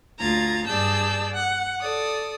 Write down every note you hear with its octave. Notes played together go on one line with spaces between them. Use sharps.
D2 F4 A#5 G#6 A6
G2 G#4 D5 A5 E6 G6
F#5
A4 D5 D#6